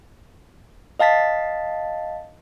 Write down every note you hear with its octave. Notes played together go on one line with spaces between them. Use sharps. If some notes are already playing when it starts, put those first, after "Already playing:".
D#5 F5 A5 A6 B6